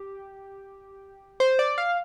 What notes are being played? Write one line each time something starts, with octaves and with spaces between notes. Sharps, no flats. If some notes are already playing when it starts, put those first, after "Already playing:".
Already playing: G4
C5
D5
F5